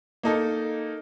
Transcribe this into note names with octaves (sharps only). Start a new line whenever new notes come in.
A#3 D#4 A4